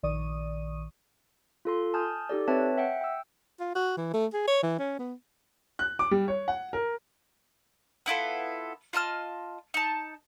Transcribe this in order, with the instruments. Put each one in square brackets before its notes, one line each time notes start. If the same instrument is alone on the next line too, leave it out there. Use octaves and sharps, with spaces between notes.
[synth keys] A#1 D#3 D5 C#6 D#6 D#7
[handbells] F4 A4 C6
G#5 A5 D#6 F6 G6
D#4 G4 A4 D5
C4 B4 C#5 E5 A5
E5 F#5 G5
G5 E6
[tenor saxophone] F4
F#4
E3
A3
G#4
C#5
E3
C#4
B3
[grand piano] F#6
D6
G3
C#5
F#5
A#4
[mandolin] B3 E4 F4 A4
F4 D#5 A5 F6
D#4 A5